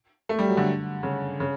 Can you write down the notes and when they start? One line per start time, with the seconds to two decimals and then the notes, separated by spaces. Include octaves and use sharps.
0.29 A3
0.39 G3
0.48 F#3
0.57 D3
1.03 C#3
1.40 C#3